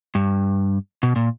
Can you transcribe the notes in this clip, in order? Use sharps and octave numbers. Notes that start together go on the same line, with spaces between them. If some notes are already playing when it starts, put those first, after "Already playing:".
G2
B2
A#2